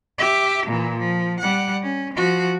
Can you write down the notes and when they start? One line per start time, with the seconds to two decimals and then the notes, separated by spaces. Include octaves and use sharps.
0.18 G4 E5
0.66 A#2 E3
0.99 F3
1.40 G3 F#5
1.83 C#4
2.14 F3 F#4